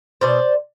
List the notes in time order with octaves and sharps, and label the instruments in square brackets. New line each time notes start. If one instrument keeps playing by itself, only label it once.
[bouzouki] B2 C5 D5